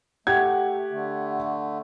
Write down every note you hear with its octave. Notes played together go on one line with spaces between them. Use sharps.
A3 G4 F#5 G#6
D3 A3